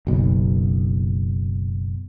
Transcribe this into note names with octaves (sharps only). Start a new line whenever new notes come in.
F#1 B1